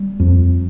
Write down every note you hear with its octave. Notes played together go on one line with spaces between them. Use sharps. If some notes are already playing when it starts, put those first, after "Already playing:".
Already playing: G3
F2